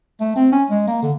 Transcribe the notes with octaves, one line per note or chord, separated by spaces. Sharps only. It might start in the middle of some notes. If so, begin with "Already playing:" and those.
A3
C4
C#4
G#3
A#3
D3